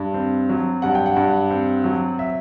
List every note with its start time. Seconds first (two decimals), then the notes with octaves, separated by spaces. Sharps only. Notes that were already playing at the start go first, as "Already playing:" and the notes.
Already playing: G2
0.14 C4
0.49 F#3
0.82 G2 F#5
0.95 G5
1.06 F#5
1.16 G2
1.51 C4
1.84 F#3
2.19 E5